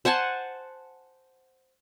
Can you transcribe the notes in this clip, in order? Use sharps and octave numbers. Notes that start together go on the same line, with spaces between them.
C5 F#5 G#5 A5